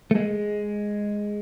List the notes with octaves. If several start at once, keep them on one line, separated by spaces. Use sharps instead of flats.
A3
G#3